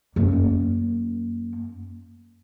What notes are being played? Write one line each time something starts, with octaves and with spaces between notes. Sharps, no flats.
F#2 A#3